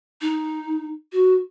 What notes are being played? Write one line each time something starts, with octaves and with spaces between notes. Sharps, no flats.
D#4
F#4